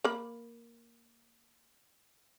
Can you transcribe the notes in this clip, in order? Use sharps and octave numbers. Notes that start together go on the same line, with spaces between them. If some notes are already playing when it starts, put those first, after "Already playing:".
A#3 B5